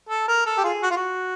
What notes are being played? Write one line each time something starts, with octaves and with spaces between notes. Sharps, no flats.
A4
A#4
A4
G4
F4 G#4
F#4
F4
F#4